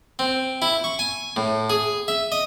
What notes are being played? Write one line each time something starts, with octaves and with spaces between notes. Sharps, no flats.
C4
E4
C#6
G#5
A2
G#4
E5
D#5